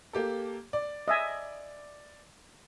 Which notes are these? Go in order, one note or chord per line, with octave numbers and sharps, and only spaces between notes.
A#3 G4 A4
D5
D#5 E5 G#5